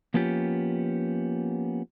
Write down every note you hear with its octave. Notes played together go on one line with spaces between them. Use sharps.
F3 A#3 B3 C#4 F4 G4